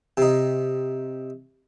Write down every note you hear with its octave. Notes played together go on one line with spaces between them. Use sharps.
C3 D#4